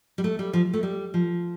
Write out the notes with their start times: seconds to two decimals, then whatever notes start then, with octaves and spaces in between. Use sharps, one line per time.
0.18 G3
0.24 A3
0.39 G3
0.53 F3
0.73 A3
0.83 G3
1.14 F3